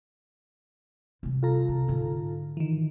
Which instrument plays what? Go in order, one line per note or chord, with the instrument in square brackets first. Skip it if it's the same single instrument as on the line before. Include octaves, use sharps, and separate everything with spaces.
[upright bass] C3 G3
[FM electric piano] F4 A4 A#5
[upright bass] C3
G#2 D3
[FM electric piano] D#3 E3